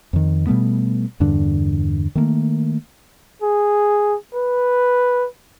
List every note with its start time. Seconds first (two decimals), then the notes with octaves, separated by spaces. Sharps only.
0.13 F2 D#3
0.47 B2 G3 A3 B3
1.20 E2 G2 D3 D4
2.15 D#3 A3 A#3
3.42 G#4
4.35 B4